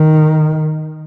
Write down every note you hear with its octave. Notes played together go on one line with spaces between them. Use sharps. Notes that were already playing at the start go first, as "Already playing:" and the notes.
Already playing: D#3